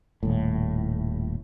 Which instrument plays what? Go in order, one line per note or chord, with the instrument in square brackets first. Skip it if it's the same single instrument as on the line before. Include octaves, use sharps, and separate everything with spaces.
[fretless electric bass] D#1 A2